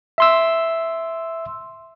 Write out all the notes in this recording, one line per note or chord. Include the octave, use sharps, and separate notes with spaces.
E5 C6 E6